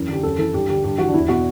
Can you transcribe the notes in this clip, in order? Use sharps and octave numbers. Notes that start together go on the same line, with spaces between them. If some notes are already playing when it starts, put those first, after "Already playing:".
Already playing: F#2 E3
D3 G4
F#2 A4
E3 A4
G2 G4
D3 G4
G2 G4
E3 F#4
D4
E2 E4
B2 F#4